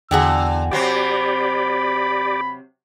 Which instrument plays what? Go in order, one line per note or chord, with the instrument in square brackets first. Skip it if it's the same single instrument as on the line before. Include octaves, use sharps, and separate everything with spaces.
[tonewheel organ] E2 [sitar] D3 [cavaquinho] F#4 G#4 G5 [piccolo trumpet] E6
[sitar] C3 F#3 C4 [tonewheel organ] G4 D5 [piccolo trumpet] B5